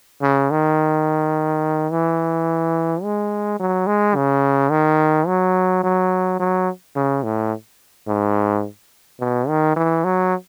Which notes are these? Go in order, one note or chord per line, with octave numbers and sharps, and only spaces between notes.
C#3
D#3
E3
G#3
F#3
G#3
C#3
D#3
F#3
F#3
F#3
C#3
A2
G#2
B2
D#3
E3
F#3